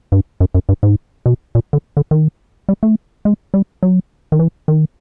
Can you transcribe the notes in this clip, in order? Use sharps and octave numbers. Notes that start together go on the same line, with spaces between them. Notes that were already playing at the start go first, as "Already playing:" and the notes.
G2
F#2
F#2
G2
G#2
B2
A#2
D3
D3
D#3
G3
A3
G#3
G3
F#3
D#3
E3
D#3